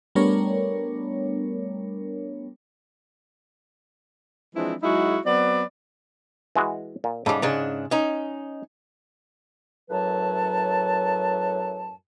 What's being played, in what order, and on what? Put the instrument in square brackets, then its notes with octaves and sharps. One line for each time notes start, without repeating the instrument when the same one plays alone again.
[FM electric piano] G3 A3 B3 D4 A#4 C#5
[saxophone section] E3 F3 G#3 C4 D4 E4
F#3 G#3 D#4 E4 F#4 G#4
F#3 B3 C4 D5
[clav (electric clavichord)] E3 G#3 F#4
A#2
[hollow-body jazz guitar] G#2 G3 [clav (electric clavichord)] C#3 A4
[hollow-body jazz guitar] G#2 C#3 D4 [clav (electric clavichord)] A#5
[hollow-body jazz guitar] C#4 D#4
[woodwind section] F#2 A2 F#3 B4 A5